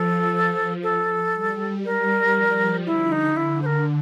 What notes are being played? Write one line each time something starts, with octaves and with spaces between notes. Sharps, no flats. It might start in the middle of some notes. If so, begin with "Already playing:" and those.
Already playing: F3 A4
A4
G3
G3 A#4
F3
D3 E4
D#4
E4
C5
A#4